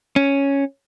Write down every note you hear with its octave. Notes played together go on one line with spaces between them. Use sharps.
C#4